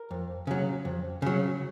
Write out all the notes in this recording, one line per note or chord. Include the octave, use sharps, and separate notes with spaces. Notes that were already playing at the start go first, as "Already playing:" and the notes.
Already playing: A#4
F2
C#3 F#3
F2
C#3 F#3